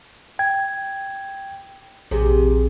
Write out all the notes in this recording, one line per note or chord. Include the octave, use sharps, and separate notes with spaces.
G5 G#6
A#1 C3 G#4